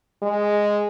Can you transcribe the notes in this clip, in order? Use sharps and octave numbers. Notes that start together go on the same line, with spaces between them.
G#3